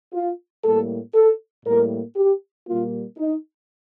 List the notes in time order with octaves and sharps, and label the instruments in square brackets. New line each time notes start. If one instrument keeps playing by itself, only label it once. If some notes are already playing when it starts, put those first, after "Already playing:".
[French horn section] F4
A2 G3 A#3 A4
A4
A2 G3 A#3 A#4
G4
A#2 G3 A#3 F4
D#4